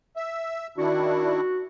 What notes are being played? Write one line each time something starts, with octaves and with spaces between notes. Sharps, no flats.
E5
D#3 D4 E4 F#4